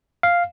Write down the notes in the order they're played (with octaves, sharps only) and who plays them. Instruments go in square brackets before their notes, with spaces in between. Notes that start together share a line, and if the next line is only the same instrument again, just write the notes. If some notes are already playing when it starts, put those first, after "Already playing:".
[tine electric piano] F5